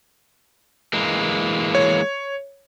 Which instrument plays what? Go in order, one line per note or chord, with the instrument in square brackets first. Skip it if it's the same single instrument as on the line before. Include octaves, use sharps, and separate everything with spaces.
[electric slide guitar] E3 G#3 A#3
[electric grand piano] C#5